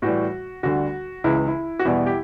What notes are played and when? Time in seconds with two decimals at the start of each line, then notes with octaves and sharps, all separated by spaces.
0.02 A2 E3 G3 F#4
0.63 D2 D3 G3 F#4
1.24 C#2 C#3 E3 E4
1.48 E4
1.79 F#4
1.85 E2 B2 G3 E4
2.06 G4